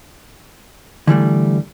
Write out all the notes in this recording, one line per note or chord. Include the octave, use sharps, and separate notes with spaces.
D3 E3 G3 A3